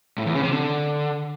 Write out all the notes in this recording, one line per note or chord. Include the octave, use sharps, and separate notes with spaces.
A2
E2
C#3
C3
D3